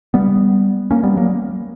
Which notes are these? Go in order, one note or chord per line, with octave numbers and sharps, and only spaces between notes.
G3 B3
A#3 C#4
G3 B3
F#3 A#3